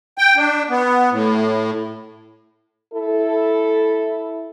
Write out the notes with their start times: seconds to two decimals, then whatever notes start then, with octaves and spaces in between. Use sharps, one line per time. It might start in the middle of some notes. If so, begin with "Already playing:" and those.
0.18 G5
0.37 D4
0.69 B3
1.12 A2
2.93 E4 A4